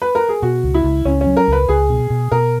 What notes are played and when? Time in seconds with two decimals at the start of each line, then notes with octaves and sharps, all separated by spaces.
0.02 B4
0.15 A#4
0.29 G#4
0.42 B2 F#4
0.63 C#2
0.74 E4
0.84 C#2
1.05 C#2 C#4
1.21 C#4
1.27 F#3
1.37 A#4
1.48 C#2 B4
1.69 C#2 G#4
1.89 B2
2.10 B2
2.32 B2 A#4